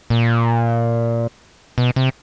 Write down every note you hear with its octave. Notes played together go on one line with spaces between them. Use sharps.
A#2
B2
C3